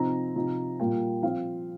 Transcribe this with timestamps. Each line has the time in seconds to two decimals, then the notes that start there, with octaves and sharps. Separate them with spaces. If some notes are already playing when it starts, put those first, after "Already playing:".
Already playing: C3 F3 C4 D#4 A#5
0.35 C3 F3 D#4
0.80 A#2 G3 A#3 F4 G5
1.23 F3 C4 F4 F5